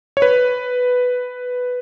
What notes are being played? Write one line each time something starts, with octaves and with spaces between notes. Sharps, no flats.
C#5
B4